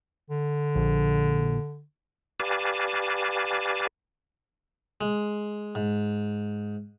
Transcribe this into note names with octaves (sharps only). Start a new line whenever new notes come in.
D3
A#1
G4 B4 D5 F5 G#5 A5
G#3
G#2